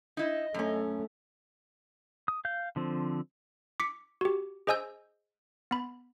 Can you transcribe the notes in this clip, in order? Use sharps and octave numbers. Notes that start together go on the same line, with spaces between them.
D#4 E4 D#5
F#2 A3 C#4
D#6
F5 G6
D3 F3 C4
D6 B6 C#7
F#4 G4
G#4 C5 D#5 G#5 E6 G6
B3 B5